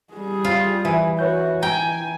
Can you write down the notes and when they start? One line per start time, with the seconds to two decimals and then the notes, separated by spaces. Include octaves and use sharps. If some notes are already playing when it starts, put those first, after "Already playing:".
0.13 G3 G#4
0.44 F4
0.85 E3 E5 G#5
1.19 F#4 B4 C#5 G6
1.63 G5 G#5 A#5